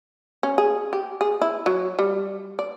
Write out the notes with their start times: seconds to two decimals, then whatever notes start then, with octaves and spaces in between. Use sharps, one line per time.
0.43 C#4
0.58 G#4
0.93 G4
1.21 G#4
1.42 E4
1.66 F#3
1.99 G3
2.59 D5